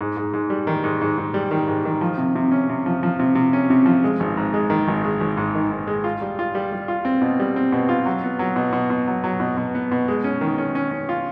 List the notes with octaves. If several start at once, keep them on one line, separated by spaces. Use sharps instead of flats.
G#2
G#2
G#2
G3
D#3
G#2
G#2
G#2
G3
D#3
G#2
D#3
F3
C3
C3
C#4
C3
F3
F3
C3
C3
C#4
C3
F3
G#3
G#1
G#2
G#3
D#3
G#1
G#3
G#1
G#2
D#3
G#2
G#3
F4
G3
F4
G3
G3
F4
C4
B2
G3
C4
B2
F4
F#3
B3
F#3
B2
B2
B2
F#3
F#3
B2
B2
B3
B2
G#3
C#4
D#3
C#4
C#4
C#4
F4